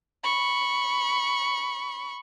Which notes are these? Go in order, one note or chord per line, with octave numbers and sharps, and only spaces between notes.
B5 C#6